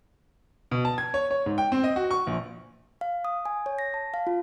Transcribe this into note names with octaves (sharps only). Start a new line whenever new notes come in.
B2
A5
G#6
C#5
C#5
G#2
G5
C4
D#5
F#4
C#6
A#1
F5
D#6
G#5
C#5
A#6
A5
F5
F4